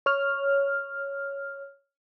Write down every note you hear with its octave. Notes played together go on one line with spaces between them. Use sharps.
C#5 F6